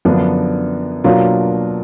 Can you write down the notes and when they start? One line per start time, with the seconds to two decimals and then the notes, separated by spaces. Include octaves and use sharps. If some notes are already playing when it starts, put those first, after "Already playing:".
0.05 F#2 D3 F3 B3 D4
1.04 B2 F#3 A#3 D4 F4